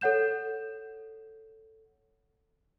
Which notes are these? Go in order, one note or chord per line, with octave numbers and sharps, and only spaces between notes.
A4 C#5 F#5 G6 E7